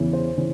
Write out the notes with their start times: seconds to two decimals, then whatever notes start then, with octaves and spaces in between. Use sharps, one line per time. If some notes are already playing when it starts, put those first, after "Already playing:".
Already playing: E2 C#3 E3
0.13 C5
0.37 C#3 E3